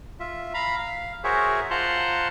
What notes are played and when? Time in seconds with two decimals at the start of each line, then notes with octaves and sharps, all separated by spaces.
0.20 F4 E5
0.54 F5 A#5 B5
0.78 F5
1.24 F#4 G#4 A#4 C5 C#5 E5
1.71 F4 C5 F#5 A5 A#5 C6